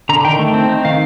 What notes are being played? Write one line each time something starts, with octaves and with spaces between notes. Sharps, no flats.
D3 A#5
D#3 G5
A3
C4
D#4
D#3 F5